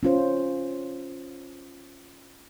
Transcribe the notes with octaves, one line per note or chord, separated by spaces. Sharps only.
C#4 F4 C5